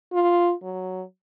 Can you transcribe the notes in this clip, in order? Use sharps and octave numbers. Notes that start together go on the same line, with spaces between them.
F4
F#3